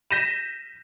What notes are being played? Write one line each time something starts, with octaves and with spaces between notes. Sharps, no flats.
G6 A#6 B6 D#7 E7